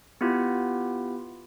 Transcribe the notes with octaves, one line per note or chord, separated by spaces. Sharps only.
B3 E4 F4 G4